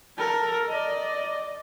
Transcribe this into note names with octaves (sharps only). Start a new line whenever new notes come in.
A4 A#4
D5 D#5